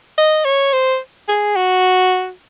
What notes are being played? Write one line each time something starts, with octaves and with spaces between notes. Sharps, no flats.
D#5
C#5
C5
G#4
F#4